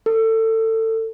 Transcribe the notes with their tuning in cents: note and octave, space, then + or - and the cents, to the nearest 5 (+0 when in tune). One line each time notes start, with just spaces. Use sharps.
A4 +25